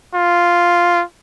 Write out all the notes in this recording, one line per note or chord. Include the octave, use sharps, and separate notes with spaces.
F4